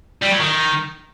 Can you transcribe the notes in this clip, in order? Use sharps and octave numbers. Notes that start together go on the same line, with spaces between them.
G3
F#3
D#3